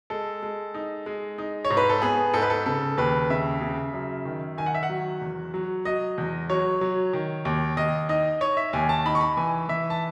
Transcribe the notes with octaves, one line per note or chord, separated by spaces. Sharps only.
G#3 A4
G#3
D#4
G#3
D#4
C#5
G#2
B4
A4
B3 G#4
G#2 A4
B4
A4
C#3 A4
D#2 B4
C#3 E5
C#3
F#2
D#3
D#3 G#5
F#5
E5
F#5
F#3
E2
F#3
F#3 D#5
E2
F#3 C#5
F#3
D#3
D#2
D#2 D#5
D#4 D#5
D#4 C#5
E5
D#2 G#5
A5
D#4 B5
C#6
B5
E3 G#5
E3 E5
A5